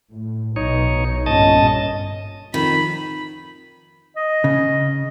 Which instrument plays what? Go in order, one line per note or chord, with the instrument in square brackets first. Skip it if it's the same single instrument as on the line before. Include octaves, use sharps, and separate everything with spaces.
[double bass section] A2
[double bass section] B1 [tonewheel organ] D#4 C#5
[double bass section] G1 A#2 C#4 [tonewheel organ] D#5 A5
[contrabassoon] F2 [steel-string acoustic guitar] D#3 [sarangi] B5
[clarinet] D#5
[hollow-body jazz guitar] C#3